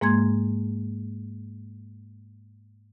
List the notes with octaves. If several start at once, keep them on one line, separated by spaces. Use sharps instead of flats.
G#2 G#3 A#3 C6 G#6